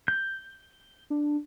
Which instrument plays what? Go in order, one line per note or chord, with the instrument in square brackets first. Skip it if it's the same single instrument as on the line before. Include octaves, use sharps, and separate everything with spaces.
[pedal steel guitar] G6
[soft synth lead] D4